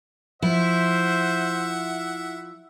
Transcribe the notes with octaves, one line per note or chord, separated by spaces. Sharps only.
F3 E4 C5 E5 F#5